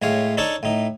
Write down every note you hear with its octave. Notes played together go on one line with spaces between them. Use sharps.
A2 G#3 C#5 F5
D4 D#4 A4 C#5 A5 C#6
A2 D#4